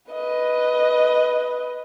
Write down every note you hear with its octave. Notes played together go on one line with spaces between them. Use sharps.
B4 D#5